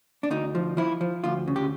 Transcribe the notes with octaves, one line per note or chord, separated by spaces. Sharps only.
D4
D2 D#4
F3
F3 E4
F3
D2 F4
C#3
G4